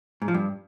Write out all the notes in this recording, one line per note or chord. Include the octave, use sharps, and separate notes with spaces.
G#2
F3
G2